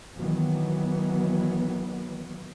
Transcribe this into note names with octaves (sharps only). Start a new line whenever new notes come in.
D#3 E3 F#3 B3